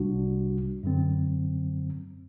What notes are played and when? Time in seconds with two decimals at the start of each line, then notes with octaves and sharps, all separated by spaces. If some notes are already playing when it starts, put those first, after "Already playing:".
Already playing: C2 C3 G3 D4 F#4
0.83 F#2 D3 F#3 C4